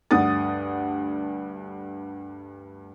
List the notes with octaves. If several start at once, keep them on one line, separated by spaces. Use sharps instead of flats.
D2 G2 F#5 D#6 A6